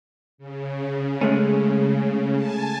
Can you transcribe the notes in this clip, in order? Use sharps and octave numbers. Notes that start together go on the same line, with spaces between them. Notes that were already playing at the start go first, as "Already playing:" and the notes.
C#3
G#3 A3 C#4
G#5 A5